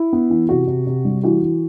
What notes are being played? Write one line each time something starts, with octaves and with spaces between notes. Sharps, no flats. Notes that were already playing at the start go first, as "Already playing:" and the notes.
Already playing: E4
B3
E3
C3 F#4
C3
C3
G3
E3 F#4
E3